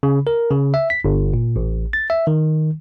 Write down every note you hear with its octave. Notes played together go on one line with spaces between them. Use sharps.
C#3
A#4
C#3
E5
B6
G1
A#2
A1
A6
E5
D#3